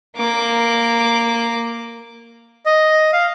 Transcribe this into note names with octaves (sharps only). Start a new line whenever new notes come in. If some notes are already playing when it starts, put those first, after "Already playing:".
A#3 D6
D#5
F5